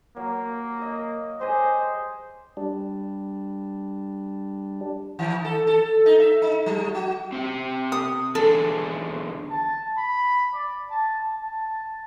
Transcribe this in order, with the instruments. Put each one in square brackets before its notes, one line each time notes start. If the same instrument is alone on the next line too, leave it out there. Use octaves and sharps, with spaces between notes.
[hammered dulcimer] F#3 [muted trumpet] A#3
[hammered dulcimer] D#5
[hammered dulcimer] G4 G#4 D#5 [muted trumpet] C5
[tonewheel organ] G3 D4
[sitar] D#3
A4
A4
D#4
E5
D#4
F#3
F#4
[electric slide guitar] C4 G4 G5
[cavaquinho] D#6
[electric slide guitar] E2 D3 G#4 [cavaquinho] A4
[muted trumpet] A5
B5
D5
A5
A5